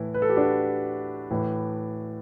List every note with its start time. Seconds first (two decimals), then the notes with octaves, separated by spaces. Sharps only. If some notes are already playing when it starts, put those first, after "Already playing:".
Already playing: A2 E3 E4
0.14 B4
0.22 A4
0.29 G4
0.36 D4 F#4
1.30 A2 E3